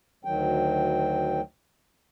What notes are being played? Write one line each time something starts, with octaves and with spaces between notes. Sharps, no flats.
D2 D#3 F#3 G5